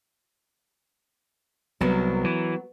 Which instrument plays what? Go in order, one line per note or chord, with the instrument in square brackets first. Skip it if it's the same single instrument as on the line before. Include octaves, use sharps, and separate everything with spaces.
[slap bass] C2 [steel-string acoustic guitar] F#3 B3 A#4
[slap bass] E3